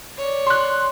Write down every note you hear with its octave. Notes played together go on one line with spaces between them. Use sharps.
C#5 D5
C6 F#6